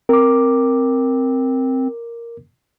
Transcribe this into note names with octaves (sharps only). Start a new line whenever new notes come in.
C4 A#4 D6